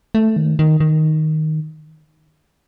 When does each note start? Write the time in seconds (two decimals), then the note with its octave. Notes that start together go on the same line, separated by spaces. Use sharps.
0.15 A3
0.36 D#3
0.59 D#3
0.80 D#3